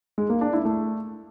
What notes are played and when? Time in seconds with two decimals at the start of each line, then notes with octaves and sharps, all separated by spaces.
0.18 G#3
0.30 A#3
0.41 D4
0.53 E4
0.65 A3